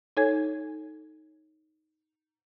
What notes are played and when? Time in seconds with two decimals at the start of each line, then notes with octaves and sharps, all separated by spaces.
0.17 D#4 A4 C#5 G#5 G#6